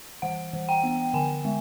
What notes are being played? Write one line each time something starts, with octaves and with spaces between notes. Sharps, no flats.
E3 F#5
E3
G5
B3
D3 G#5
G#3